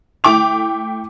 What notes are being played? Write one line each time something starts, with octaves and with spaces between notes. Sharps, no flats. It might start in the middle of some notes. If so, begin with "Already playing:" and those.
A3 E4 G5 D6 F7